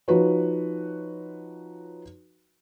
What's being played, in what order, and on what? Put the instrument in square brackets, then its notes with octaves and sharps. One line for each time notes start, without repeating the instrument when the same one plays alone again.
[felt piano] F3 D#4 F#4 B4 C#5